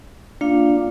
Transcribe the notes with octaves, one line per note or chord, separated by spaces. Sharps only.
A#3 D4 F4 F5